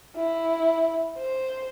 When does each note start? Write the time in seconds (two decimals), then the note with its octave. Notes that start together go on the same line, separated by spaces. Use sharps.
0.17 E4
1.18 C5